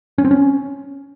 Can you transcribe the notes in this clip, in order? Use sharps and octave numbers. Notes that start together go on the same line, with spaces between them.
C#4
C4
C#4